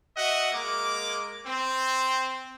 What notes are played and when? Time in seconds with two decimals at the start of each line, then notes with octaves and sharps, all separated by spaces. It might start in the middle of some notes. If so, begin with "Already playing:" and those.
0.15 F#4 D#5 E5 F#5
0.52 G#3 A#3 A#4 D6
1.46 C4